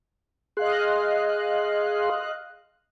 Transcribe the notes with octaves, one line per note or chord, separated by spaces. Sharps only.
G#4 D#5 F5 C6 F#6